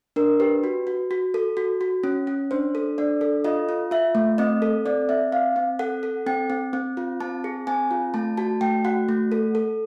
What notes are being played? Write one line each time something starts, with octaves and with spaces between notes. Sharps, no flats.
D4 A#4
G4 B4
F#4
F#4
F#4
A4
F#4
F#4
C#4
C#4
D4 C5
A4
D4 D5
A4
F4 D#5
F4
F4 E5
A3
C4 D#5
A4
C4 D5
C4 E5
C4 F5
C4
A4 F#5
A4
C4 G5
C4
C4
F4
C4 A5
G#4
C4 G#5
F4
A3 A5
F#4 A5
A3 G5
F#4 F#5
A3
A4
A4